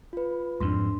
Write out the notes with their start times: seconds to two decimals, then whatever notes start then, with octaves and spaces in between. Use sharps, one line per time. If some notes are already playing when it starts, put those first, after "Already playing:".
0.13 F4 B4
0.60 F2 G#2 D4 C6